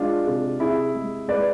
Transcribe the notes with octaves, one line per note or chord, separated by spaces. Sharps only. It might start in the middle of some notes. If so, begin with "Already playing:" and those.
Already playing: G#3 D4 F4
C3
C3 E4 G#4
G#3
G#3 B4 D5